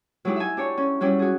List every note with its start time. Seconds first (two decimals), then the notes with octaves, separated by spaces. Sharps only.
0.25 F#3 G#3 D#4 E4 G4
0.36 E5 G#5
0.57 D4 G4 C#5
0.77 C#4
1.00 F#3 G3 C#4 E4 G4
1.19 F#4 G#4